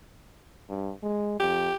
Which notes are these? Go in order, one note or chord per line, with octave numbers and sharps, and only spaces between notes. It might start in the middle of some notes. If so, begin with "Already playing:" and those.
G2
G#3
F2 G4